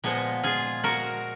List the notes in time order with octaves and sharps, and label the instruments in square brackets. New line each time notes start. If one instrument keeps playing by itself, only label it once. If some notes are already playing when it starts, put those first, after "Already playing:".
[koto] A#2 F3 G#3 B3
F4 G#4
F#4 A#4